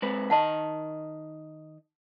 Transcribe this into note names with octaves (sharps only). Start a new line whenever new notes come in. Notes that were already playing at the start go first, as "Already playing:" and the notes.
G#3 C4 B4
D#3 D#5 F#5 A5 B5